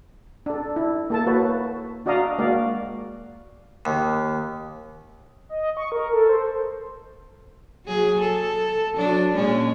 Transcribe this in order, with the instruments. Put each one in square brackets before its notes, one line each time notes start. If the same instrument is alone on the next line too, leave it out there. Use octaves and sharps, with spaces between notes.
[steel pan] D4 A4
E4
A#3 A4 A5
A#3 F#4 B4 C#5
D4 F#4 D5 D#5 F5 A#5
G#3 A#3 F#4 D5 F5
[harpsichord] D#2
[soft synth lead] D#5
C#6
A#4
A4
C5
[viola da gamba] F#3 G#4
A4
F#3 D4
A#2 G#3 C#4